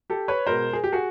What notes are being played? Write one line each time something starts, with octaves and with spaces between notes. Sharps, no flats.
G4 A4
B4 C#5
B2 G#3 A#4 C5
G#4
G4
F#4 G#4